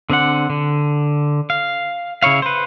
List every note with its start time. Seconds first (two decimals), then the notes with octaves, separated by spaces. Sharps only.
0.10 D3 C4 D4 F#5
0.50 D3
1.50 F5
2.22 C#3 E4 C#5 F5
2.42 B4 C5